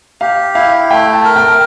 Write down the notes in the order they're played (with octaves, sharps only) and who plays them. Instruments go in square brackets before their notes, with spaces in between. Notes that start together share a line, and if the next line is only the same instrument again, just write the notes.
[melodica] G4 [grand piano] F5
[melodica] E4 [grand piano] F5
[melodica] A3 [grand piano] G5
[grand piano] A5
[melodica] A#4
[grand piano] G5